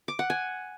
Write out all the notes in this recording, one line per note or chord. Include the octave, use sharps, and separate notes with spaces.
D6
F#5
G#5